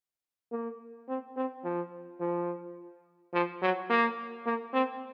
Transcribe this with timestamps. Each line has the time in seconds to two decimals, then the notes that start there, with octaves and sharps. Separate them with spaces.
0.52 A#3
1.08 C4
1.37 C4
1.64 F3
2.20 F3
3.34 F3
3.62 F#3
3.90 A#3
4.46 A#3
4.73 C4